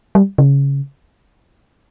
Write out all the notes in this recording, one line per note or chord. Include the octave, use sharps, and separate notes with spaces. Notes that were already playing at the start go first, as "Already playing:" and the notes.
G3
C#3